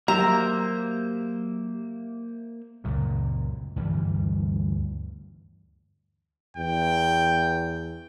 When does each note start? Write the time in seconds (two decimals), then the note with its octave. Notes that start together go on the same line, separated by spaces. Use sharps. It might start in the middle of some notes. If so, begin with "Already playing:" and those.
0.08 F#3 A#3 G4 C5 E5 A#5
2.84 C#2 F#2 A#2
3.76 D2 G2 E3 G3
6.57 E2 G5